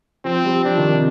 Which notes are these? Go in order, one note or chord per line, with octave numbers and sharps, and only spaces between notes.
F3 C4
G3
F3 D4
D#3
C3